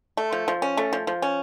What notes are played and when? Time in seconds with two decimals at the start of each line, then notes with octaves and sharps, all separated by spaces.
0.17 A3
0.33 F3
0.48 F3
0.62 C#4
0.77 A3
0.93 F3
1.07 F3
1.22 C#4